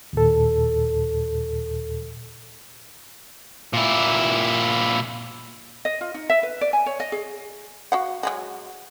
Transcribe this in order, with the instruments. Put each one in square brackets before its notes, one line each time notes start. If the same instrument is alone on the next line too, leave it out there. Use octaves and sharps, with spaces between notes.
[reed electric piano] D#2 A#2 A4
[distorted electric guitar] A#2 E4
[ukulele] D#5
F4
D#4
E5
B4
D5
G#5
C#5
D#5
G#4
[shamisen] F#4 F5 F#5
F#3 G#3 F#4